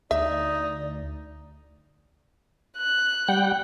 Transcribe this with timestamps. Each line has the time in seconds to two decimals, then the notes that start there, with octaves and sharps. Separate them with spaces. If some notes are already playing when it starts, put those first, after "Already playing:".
0.11 D2 D#4 D5 E5
2.78 F#6
3.28 G3 F#5 G5